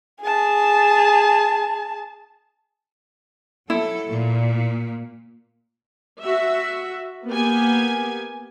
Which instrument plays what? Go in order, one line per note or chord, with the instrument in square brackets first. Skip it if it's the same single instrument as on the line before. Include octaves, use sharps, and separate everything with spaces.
[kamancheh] G#4 A5
[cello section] F#3 A4 [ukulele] E4
[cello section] A#2
[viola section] F#4 E5
A#3 B3 G4 G#5